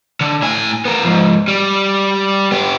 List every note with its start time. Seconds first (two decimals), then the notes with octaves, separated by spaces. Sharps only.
0.21 D3
0.43 A2 G#5
0.85 B3 A#4
1.03 G#2 F3
1.48 G3
2.52 B3 G4